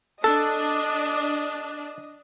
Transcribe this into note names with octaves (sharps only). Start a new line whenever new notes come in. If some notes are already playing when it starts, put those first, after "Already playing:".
D4 A4 D#5